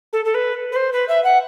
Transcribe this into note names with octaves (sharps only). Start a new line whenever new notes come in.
A4
A4
B4
B4
C5
B4
E5
F#5